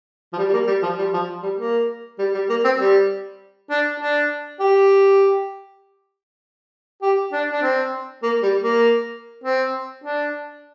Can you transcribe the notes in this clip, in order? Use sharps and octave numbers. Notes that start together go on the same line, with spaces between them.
F3
G3
G3
A#3
G3
F3
G3
F3
G3
A#3
G3
G3
A#3
C4
G3
D4
D4
G4
G4
D4
D4
C4
A#3
G3
A#3
C4
D4